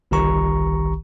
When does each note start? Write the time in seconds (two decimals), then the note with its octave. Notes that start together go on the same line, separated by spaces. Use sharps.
0.11 G1 C2 D#3 G4 A#5 C#6